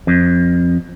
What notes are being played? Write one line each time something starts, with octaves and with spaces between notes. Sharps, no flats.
F2